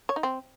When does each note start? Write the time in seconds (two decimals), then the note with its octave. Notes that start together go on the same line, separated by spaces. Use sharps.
0.09 C#5
0.16 D#4
0.23 C4